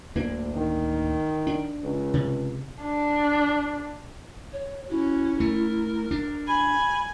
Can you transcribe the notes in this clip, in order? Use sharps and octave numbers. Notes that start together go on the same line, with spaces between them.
D1 D2 A#3 D4
D#3
D4
C#2
C3
D4
C#5
C#4 E4 F#4
A3 A#4
D4
G#5 B5